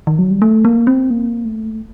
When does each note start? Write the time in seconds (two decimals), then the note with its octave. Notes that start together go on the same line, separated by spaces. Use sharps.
0.07 D#3
0.19 F#3
0.31 G3
0.42 A3
0.65 A#3
0.87 C4
1.10 A#3
1.45 A3